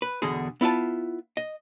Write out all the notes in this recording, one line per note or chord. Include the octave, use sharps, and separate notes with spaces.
B4
E2 B2 D3 G#4
B3 E4 F4 A5
D#5